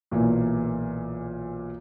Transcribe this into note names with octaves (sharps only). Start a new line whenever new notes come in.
B1 A#2 E3 A#3